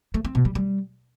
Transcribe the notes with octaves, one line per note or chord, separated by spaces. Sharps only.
A3
C4
B2
G3
G3